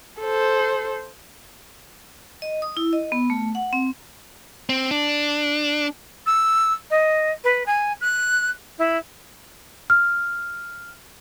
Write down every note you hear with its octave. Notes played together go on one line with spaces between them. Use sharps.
A4 C5
D#5
D#6
E4
D#5
B3
A3
F#5
C4
C4
D4
E6
D#5
B4
G#5
F#6
E4
F6